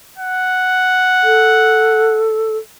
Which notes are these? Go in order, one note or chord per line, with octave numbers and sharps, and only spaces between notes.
F#5
A4